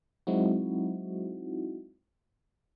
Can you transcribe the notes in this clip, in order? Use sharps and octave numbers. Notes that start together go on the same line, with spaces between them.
F#3 G#3 C4 D#4 E4 F#4